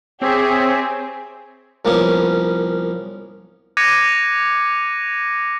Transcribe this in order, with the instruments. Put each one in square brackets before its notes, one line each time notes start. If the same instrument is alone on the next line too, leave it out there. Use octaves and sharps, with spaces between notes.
[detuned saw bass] C4 [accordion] G4 C#5 E5 [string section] G#4
[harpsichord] C2 F3 A#3 B3 C#4 D#6
[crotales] D6 F#6 G#6 A#6 C#7 D#7